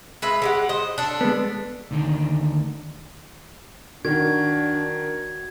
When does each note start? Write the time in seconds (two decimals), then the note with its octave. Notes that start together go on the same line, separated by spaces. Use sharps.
0.22 G#3 B4 E5
0.42 G#3 G4 F#5
0.69 C5 D#5
0.98 D4 A4
1.21 G#3 B3
1.91 D2 D#3 D4
4.05 D#3 D4 F#4 G#6